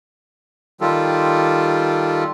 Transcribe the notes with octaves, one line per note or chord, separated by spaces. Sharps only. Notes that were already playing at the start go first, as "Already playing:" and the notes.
D#3 G3 F4 G4 A4